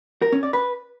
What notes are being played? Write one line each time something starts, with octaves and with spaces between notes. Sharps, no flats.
A#4
C#4
D5
B4